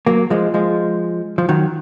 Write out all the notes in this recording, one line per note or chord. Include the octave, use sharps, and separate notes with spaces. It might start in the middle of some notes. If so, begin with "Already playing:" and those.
F#3 A#3
F3 G#3
F3 G#3
F3
D#3 F#3